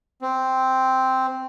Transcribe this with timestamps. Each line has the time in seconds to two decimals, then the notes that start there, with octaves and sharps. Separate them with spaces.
0.22 C4